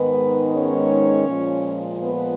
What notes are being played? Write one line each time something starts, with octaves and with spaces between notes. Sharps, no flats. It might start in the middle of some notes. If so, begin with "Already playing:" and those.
Already playing: G#2 D#3 G#3 B3 B4
C#4 C#5
A#2 F3 G#3
B3 B4